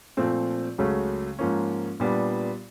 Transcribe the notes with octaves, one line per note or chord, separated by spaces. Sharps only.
A#2 F3 A3 C4
C#2 C#3 F#3 A3 C#4
G#2 F3 A#3 C#4
A#2 G3 B3 D4